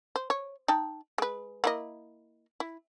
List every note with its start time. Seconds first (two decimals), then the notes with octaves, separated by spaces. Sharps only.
0.16 C5
0.30 C#5
0.68 D#4 G5 A5
1.18 G#3 B4
1.64 A#3 E4 D#5
2.60 E4